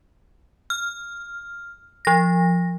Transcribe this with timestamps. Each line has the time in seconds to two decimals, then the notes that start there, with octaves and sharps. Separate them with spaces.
0.70 F6
2.05 F3 A#6